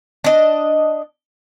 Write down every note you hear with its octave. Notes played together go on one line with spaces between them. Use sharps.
D4 D#5